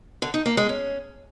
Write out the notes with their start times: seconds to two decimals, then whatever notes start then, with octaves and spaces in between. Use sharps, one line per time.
0.22 D3
0.34 D#4
0.46 A#3
0.57 G#3
0.69 C#4